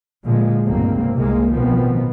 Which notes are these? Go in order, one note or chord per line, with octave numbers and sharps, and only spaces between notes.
A#2 D3 F3 G#3
F1 C#2 G2 A#3 C4
C2 C3 G#3 A#3
A1 B2 D#3 F3 B3 C4